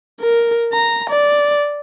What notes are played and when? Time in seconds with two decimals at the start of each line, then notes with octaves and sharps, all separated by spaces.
0.21 A#4
0.73 A#5
1.10 D5